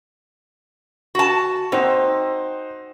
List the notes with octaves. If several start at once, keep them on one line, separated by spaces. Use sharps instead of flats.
F#4 A5
C4 D#4 C5 F#5